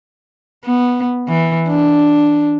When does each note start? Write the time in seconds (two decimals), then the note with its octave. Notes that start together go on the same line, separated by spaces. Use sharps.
0.64 B3
1.28 E3
1.68 D4